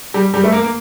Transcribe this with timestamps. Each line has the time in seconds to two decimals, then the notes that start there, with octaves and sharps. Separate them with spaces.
0.14 G3
0.34 G3
0.43 A3
0.52 A#3
0.63 A#3